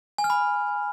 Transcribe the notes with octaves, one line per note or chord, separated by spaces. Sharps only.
G#5
F6
B5